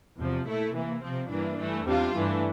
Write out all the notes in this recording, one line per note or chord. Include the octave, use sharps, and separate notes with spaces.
E2 C3 F3
A#2 A3 E4
C3 E3 A#3
C3 F3 C4
G2 E3 A#3 D4
G2 E3 A3
E2 C3 G3 D4 F4
G2 E3 A3 D4